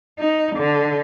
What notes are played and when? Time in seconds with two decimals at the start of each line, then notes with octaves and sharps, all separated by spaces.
0.19 D#4
0.56 D3